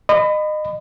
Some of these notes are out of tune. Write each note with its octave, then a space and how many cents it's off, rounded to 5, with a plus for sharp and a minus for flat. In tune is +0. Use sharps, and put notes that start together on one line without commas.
D#5 -25 B5 +25